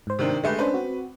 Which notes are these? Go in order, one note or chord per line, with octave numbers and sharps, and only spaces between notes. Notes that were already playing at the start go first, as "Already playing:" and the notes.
G#2 C5
C3 D#3 D4
D3 G#3 A3 G4 B4
C#4 D4 B4 C5
C4 F#4